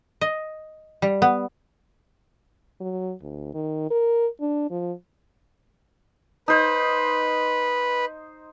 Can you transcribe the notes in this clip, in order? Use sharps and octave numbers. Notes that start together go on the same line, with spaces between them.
D#5
G3
B3
F#3
D2
D#3
A#4
D4
F3
D#4 B4 C5